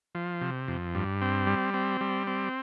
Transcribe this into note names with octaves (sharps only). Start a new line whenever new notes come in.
F3
C3
F2
G2
C4
G3
C4
G3
C4